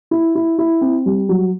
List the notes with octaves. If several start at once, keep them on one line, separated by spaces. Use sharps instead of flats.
E4
E4
E4
C4
G3
F#3